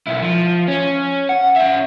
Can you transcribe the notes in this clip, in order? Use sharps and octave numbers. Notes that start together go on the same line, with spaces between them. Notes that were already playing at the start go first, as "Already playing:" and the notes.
B1 E4
F3
C#4
F#5
C#4 E5